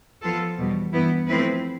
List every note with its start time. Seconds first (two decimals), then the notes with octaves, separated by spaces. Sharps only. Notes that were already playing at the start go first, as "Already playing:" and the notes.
0.23 F3 B3 F4 A4
0.59 E2 B2 G3
0.93 G2 E3 B3 E4
1.28 F3 A3 C4 E4 B4